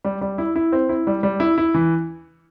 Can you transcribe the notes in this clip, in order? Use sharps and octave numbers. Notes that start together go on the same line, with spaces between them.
G3
G3
E4
E4
C4
E4
G3
G3
E4
E4
E3